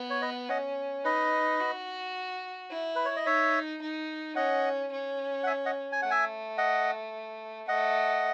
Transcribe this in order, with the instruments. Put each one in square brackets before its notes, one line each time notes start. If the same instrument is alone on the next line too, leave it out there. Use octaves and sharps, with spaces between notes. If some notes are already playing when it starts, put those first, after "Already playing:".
Already playing: [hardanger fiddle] B3
[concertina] C#5
B4 D#5
[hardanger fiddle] C#4 [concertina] D#5 F#5
[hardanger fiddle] D#4 [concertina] B4 D#5
[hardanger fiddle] F#4
E4
[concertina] B4
C#5
D#5
[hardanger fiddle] D#4 [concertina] C#5 E5
[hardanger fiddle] D#4
[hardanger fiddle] C#4 [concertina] D#5 F#5
[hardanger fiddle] C#4
[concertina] F#5
E5 G#5
D#5 F#5
G#5
[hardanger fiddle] A3 [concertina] F#5
[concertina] E5 G#5
D#5 F#5
[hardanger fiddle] A3 [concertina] D#5 F#5